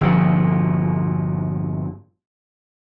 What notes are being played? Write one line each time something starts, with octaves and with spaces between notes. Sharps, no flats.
G1 A#2 F3